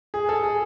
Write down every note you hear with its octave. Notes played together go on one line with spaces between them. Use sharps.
G#4
A4
G#4